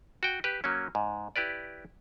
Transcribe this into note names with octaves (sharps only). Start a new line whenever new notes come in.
F#4 G5
G4 B4
F#3 A#3 C#4
G#2
E4 G4 B4 D5